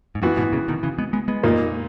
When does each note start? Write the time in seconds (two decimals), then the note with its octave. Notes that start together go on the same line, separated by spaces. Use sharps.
0.15 G#2
0.22 F#2 A#2 E3 B3 F#4
0.37 G#2 B2
0.53 A#2 C#3
0.68 B2 D#3
0.83 C#3 E3
0.98 G#3 B3
1.13 G#3 B3
1.28 G#3 B3
1.43 A#2 A#3 D#4